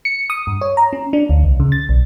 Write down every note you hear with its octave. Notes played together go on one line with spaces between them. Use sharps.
C#7
D#6
G2
C#5
A#5
C#4
D4
D2
C2
C#3
A6
B1